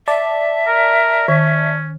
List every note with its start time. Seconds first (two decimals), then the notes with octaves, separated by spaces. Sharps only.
0.08 D5 E5 A5
0.67 A#4
1.28 D#3 C#4